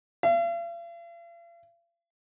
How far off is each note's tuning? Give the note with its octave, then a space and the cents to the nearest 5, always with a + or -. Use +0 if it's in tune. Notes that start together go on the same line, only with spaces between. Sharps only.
F5 -45